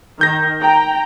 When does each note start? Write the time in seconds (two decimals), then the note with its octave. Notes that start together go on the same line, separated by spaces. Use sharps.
0.21 D#3 G6 A#6
0.60 G5 A#5